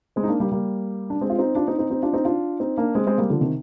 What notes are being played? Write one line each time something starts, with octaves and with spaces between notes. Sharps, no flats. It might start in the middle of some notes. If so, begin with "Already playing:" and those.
G#3 C4
D#4
A#3 D4
G3 A#3
G3 A#3
D4
G#3 C4
F4
C4 D#4
D4 F4
C4 D#4
C4 D#4
C4 D#4
D4 F4
C4 D#4
D4 F4
C4 D#4
A#3 D4
G#3 C4
G#3 C4
G3 A#3
D3 F3
C3 D#3